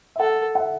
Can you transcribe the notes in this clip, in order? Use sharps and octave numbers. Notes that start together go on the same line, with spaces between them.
E5
A4 F#5
F#5
E5